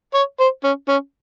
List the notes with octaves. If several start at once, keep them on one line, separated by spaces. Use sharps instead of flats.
C#5
C5
C#4
C#4